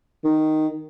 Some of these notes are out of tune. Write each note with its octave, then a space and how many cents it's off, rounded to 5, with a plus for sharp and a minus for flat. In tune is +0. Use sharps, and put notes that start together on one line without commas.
D#3 -5